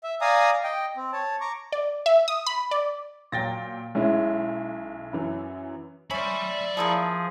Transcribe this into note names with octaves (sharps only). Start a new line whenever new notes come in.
E5
D5 F5 G#5 A#5 D#6
D#5 G5
C4
C#5 A5
A#5 C#6 D6
D5
E5
D#6
B5
D5
A#2 F#3 G5 A6 A#6
B1 G#3 C#4 E4
F#2 E3 F#3
C#4 C5 D5 E5 B5
F3 A#3 E4 G#4 A4